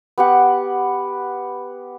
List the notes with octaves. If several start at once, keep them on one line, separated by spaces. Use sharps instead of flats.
B3 G4 F#5